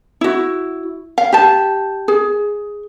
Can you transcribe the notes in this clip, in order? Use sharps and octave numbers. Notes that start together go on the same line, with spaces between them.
E4 F#4
F5
G4 A5
G#4